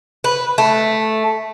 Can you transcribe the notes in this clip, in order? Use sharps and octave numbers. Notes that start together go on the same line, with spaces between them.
B4
A3